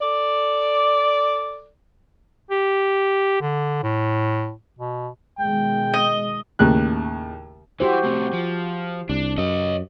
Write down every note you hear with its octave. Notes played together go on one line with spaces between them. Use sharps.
A4 D5
G4
D3
A2
B2
B2 D#3 G#3 G5
D#5
D#2 A2 C#3 F#6
E3 F#4 G4 C5
A2 C3
F3
C2 D4
F#2 C#5 D#5